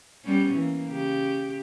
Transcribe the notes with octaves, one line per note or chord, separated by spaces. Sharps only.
G3 B3 C#4
E3 A#3
C#3 G4